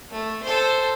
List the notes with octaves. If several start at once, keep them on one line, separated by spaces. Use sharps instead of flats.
A3
A4 C5